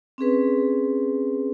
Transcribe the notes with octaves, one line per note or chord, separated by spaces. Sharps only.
C4 C#4 G#4 B4